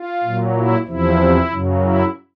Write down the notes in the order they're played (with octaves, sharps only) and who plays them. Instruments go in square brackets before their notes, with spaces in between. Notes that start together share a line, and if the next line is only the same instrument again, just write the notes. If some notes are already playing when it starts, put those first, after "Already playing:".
Already playing: [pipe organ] F4
A#2 F#3
E4
E2 C3 F3 E4
F#2 C#3 F#3
E4